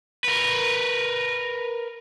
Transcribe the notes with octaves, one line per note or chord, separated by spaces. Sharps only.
A#4 B4